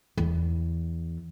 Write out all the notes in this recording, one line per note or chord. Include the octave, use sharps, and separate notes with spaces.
E2